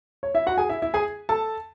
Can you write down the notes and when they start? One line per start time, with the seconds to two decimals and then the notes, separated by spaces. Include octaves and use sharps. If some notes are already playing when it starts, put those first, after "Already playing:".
0.23 C#5
0.34 E4 E5
0.47 F#4 F#5
0.58 G#4 G#5
0.69 E4 E5
0.82 E4 E5
0.94 G#4 G#5
1.29 A4 A5